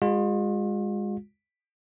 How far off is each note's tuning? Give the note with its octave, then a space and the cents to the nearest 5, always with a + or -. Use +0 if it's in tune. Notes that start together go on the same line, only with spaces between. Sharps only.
G#3 -25 F4 +40